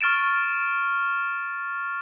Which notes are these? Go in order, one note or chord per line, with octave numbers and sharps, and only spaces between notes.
C#6 F6 A6 D7 E7